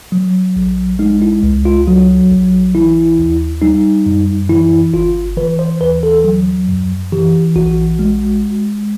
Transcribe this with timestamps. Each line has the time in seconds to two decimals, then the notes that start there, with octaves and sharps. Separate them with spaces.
0.12 F#3
0.56 A#1
0.99 G#3 D#4
1.22 E4
1.43 C#2
1.65 F4
1.87 F#3 F#4
2.31 A#1
2.75 E3 E4
3.18 D#2
3.62 G3 D#4
4.06 F#2
4.49 E3 E4
4.94 G1 F4
5.37 E3 B4
5.59 C5
5.81 D#2 B4
6.03 A4
6.24 F#3
6.68 F#2
7.12 E3 G4
7.56 A#1 F#4
7.99 G#3